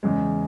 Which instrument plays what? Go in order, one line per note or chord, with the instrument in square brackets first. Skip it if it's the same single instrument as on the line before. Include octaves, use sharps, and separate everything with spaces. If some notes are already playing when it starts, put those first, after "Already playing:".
[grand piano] E2 C#3 G#3